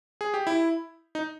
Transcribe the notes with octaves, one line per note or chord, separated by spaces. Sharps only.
G#4
G4
E4
D#4